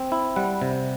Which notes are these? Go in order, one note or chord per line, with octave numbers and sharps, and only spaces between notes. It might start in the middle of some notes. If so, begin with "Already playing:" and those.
Already playing: C4
E4
G3 F#5
C3